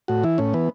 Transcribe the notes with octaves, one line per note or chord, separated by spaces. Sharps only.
A2 F#4
E3 E4
A2 C#4
E3 B3